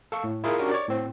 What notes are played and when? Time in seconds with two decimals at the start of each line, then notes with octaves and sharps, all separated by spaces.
0.12 A4 F5 C#6
0.24 A2
0.44 E4 F4 G#4 A#4
0.59 C#4 D4 F#4 G4 A#4
0.71 C#5 D5
0.88 A2 C4